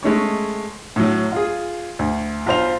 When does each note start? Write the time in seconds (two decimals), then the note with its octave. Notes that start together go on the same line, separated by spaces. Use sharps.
0.03 G#3 A3 C#4 C#5
0.96 A2 F#3
1.32 F4 G#4
1.99 D2
2.46 B1 F4 C5 F7